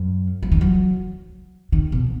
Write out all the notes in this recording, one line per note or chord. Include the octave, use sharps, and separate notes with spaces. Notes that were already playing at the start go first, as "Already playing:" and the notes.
Already playing: F#2
F#3
D#3
F#3
D#3
B2